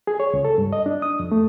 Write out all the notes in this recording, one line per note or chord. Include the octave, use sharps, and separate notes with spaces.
G#4
C#5
C#2
A4
G2
D#5
D4
D#6
F2
A3